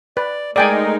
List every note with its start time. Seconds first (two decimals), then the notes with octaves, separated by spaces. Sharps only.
0.17 B4 D5
0.56 G#3 A3 D#4 G#4 A#4 D5 G5 G#5